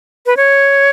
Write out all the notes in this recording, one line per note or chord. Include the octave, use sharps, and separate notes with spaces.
B4
C#5